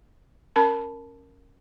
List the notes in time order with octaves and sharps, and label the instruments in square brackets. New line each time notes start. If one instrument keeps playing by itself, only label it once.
[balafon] C#4 A#4 A5 B5